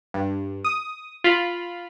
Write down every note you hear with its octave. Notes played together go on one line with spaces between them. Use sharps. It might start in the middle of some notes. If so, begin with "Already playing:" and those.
G2
D#6
F4 B5